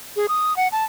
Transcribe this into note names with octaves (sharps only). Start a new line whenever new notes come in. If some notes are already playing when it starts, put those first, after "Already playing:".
G#4
D#6
F#5
A5